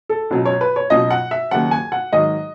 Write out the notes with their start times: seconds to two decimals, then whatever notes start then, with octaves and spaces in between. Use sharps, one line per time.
0.09 A4
0.30 C#2 B2 F#3
0.45 C#5
0.61 B4
0.76 C#5
0.90 C#2 B2 F#3 D#5
1.10 F#5
1.31 E5
1.51 D#2 C#3 F#3 F#5
1.71 G#5
1.92 F#5
2.12 G#2 D#3 F#3 D#5